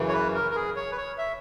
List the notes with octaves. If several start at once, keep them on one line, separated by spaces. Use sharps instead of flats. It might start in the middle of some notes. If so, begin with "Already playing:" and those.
Already playing: F#2 C#3 E3
C#5
B4
A#4
A#4
G#4
C#5
B4
C#5
E5